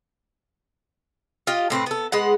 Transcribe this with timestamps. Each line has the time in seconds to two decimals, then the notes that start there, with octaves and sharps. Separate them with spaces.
1.47 F4 G4 D#5
1.70 A2 C4 G4 B4
1.86 B3 A4
2.12 G#3 B3 F#5